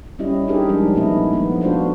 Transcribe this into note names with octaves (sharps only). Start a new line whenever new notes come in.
G3 C#4 E4 G4 D#5
D4 D#4 G4 G#4 A#4
F3 G3 G#3 D4 D#4
A#2 A3 B3 D#4 E4 D#5
F3 A3 B3
A3 B3 D4 F4 F#4 C5